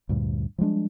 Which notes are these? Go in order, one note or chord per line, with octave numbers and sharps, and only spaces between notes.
D2 G2 A#2
F3 G3 G#3 D4